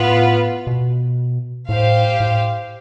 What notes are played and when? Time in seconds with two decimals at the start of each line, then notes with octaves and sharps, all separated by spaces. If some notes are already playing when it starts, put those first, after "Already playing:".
Already playing: A2 B3 F4 B4
0.67 B2
1.69 A2 G4 C5 F5
2.20 A2